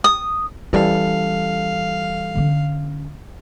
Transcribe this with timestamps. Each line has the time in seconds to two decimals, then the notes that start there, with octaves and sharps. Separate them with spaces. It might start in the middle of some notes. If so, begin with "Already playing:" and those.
0.04 D#6
0.73 E3 G3 C#4 A4 F5
2.35 D3 C#4